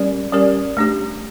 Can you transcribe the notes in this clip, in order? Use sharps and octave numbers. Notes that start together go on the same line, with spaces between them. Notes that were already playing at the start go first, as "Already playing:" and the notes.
Already playing: G3 C#4 G4 A#4 D5
G3 C#4 G4 A#4 D5
A3 D4 G4